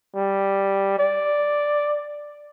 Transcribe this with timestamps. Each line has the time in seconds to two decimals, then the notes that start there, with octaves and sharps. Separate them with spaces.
0.16 G3
0.99 D5